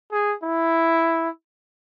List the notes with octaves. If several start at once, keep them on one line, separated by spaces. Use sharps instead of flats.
G#4
E4